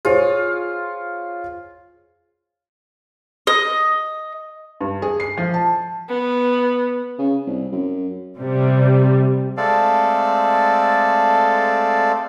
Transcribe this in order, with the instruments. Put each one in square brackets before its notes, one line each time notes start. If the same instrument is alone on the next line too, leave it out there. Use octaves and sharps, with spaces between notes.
[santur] F4 [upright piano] G#4 C5 C#5
[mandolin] D#5
[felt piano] G2
G#4
C7
F3
A5
[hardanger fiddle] B3
[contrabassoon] C#3
C2
F#2
[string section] C3 G3
[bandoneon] G#3 A3 C4 A4 D5 F5